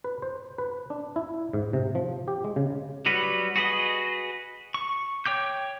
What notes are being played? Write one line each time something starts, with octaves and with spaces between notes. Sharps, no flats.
B4
C5
B4
D4
E4
G#2
C3
F3
G4
G#3
C#3
F#3 G3 F#4 B4
F#4 G#4 B4 D#5
C#6
C#5 G5 D6 G6